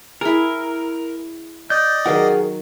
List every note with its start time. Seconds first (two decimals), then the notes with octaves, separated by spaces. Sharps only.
0.21 E4 G#4 A#4
1.70 D5 D#5 G6
2.06 D#3 F#3 G#4 A#4 F#5